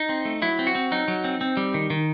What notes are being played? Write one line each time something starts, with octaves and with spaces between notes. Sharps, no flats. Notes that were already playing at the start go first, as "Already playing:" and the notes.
Already playing: D#4
C4
A3
F#3 E4
C4
F#4
C4
F#3 D#4
F#3
C4
C4
G3
D#3
D#3